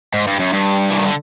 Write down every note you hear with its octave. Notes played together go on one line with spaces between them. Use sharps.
G#2
G2
F#2
G2
E3
D#3
D3